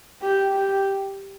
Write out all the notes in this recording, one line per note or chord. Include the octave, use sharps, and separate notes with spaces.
G4
G4